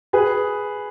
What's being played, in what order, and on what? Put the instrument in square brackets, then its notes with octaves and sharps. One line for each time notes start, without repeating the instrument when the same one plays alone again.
[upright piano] G#4 B4